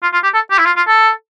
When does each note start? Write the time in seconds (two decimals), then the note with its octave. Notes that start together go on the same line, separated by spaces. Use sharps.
0.02 F4
0.13 F4
0.23 G4
0.34 A4
0.51 G4
0.58 E4
0.65 F4
0.76 F4
0.87 A4